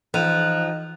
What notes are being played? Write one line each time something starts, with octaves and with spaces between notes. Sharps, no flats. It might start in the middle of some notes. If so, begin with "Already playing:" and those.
E3 F3 D#4 F#6 D#7 F7